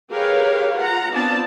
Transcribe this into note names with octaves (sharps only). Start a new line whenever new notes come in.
G4 G#4 A#4 B4 C#5 F5
F4 F#5 A#5
B3 C4 D4 F4 D5 A5